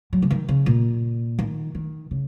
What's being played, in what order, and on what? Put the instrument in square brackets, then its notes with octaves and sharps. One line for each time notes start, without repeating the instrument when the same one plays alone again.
[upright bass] F#3
C#3
D#3
C#3
A#2
D#3
D#3
C#3